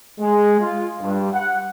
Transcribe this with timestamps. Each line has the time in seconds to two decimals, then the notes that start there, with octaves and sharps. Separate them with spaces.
0.19 G#3
0.60 F4
1.01 G2
1.33 F#5